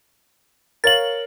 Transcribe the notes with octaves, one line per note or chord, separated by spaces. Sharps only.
A#4 C#5 F5 A6 F#7